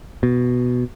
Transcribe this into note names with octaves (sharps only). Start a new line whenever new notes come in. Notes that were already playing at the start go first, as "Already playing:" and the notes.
B2